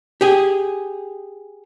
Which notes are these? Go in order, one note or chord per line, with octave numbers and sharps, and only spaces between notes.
G4 G#4